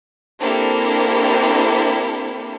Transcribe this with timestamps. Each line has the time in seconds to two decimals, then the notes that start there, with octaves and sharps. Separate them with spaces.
0.39 A#3 C4 D4 E4 G4 A4